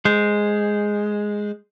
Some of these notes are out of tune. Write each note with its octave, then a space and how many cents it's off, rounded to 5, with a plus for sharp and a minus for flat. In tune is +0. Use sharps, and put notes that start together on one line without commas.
G#3 +0 C5 -10